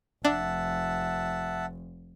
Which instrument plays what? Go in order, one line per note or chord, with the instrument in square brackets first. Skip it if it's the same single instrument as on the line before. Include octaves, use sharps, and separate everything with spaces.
[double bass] F1 [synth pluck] D4 [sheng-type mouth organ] E5 F#5 A5